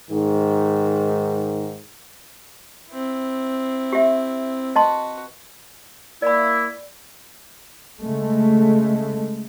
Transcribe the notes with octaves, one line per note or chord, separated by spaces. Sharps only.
G#2 D#3
C4 E4
G4 E5
F#4 B4 D#5 A5 C6
A#3 E4 D5 B5
C#3 G#3 A3